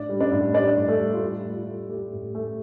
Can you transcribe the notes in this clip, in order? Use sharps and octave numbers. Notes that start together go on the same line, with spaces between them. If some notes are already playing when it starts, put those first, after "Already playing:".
Already playing: A2 D4 D5
G3
D4 D5
A2
G3 D4 D5
A2
A3 A4
G3
F4
A2 G4
A3
F4
A3
A3 G4
A2
A3